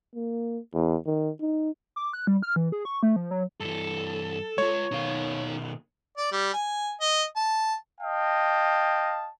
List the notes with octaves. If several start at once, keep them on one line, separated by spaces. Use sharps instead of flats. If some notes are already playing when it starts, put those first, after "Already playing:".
A#3
E2
D#3
D#4
D6
F#6
G3
F6
E3
G#4
C#6
A3
F3
F#3
G2 E3 A4
G#3 F4 C#5
B2 D#3 D#4 F5
D5
G3
G#5
D#5
A5
D#5 F5 G5 A5